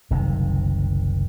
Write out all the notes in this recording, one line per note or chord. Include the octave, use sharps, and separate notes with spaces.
F#1 C2 C3 D#3